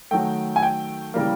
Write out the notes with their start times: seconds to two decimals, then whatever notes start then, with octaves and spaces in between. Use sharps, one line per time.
0.11 D#3 F#3 A3 G5
0.56 G#5
0.63 G5
1.14 C#3 E3 G3 A#3